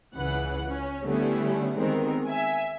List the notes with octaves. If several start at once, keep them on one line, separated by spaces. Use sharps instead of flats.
C#2 C#3 E3 B4 F#5 F#6
C#4
D3 G3 A3 B3 C#4 E4
D#3 G#3 B3 C4 A#4
E5 G#5